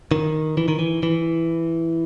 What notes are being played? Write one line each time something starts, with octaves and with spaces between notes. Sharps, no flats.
D#3
E3
D#3
E3
E3